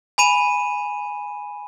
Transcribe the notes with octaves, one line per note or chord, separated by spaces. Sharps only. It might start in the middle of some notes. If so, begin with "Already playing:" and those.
G#5 B5 D#7 E7